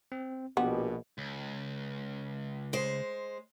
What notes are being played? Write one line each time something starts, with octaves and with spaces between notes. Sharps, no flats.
C4
A#1 B2 B3 G4
C#2
G#3 C5